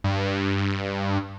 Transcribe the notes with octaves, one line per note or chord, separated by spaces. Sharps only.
G2